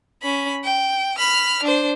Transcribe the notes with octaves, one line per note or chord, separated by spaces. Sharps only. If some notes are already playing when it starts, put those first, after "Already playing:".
C#4 B5
G5
B5 F6
D4 C5